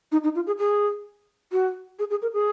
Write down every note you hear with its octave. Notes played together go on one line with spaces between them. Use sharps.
D#4
D#4
F4
G#4
G#4
F#4
G#4
G#4
A#4
G#4